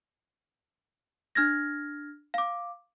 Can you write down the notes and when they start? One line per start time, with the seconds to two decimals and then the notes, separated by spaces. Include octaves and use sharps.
1.35 D4 F6 G#6 A#6
2.34 F5 D6